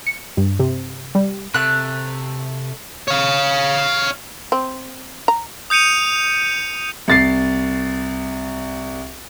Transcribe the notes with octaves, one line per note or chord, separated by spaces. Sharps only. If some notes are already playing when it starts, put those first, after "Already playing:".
C#7
G2
C3
G3
C3 A3 F#6
C#5 F5
C4
A#5
D#6 G6 C#7 D#7 F7
C2 A6 C7